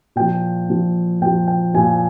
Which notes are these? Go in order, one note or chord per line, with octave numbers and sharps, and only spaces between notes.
A#2 F3 G5
A#2 F3
A#2 F3 G5
G5
A#2 F3 G#5